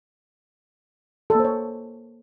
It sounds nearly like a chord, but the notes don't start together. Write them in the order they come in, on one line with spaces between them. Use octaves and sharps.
A4 A#3 C5 C#5